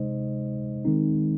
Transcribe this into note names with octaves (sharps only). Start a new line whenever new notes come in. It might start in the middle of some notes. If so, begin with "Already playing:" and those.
Already playing: C3 G#3 D#4 C5 D#5
D#3 G#3 C4 D#4